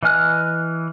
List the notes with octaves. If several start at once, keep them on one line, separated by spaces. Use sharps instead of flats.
E3 D#5 G#5 F6 F#6